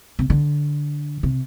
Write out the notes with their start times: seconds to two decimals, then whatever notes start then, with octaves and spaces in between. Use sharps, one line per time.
0.19 C3
0.30 D3
1.23 C3